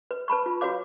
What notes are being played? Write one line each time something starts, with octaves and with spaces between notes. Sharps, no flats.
B4
B4 A5 B5 C#6
F4
F#4 B4 C#5 F5 D6